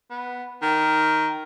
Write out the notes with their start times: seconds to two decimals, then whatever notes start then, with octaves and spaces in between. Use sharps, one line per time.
0.11 B3
0.62 D#3